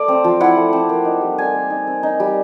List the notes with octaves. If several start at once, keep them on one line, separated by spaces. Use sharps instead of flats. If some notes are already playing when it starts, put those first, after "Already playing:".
Already playing: A3 D5
C4
F3
E4 F#5
A3
C4
A#3
D#4
G3
G3 G#5
A#3
D#4
C4
D#4
G3